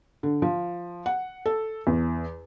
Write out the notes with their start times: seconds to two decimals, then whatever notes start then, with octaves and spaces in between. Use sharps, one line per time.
0.23 D3
0.42 F3
1.06 F#5
1.46 A4
1.87 E2